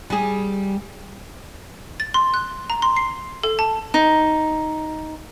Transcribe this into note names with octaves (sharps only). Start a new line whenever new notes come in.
G3 G#4
A6
C6
F#6
A#5
C6
C7
A4
A5
D#4